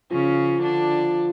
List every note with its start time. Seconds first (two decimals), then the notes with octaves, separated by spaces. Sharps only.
0.11 C#3 F3 C#4
0.62 D3 D4